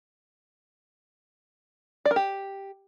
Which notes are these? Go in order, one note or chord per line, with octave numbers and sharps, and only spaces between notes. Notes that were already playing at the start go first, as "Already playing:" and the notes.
D5
A#4
G4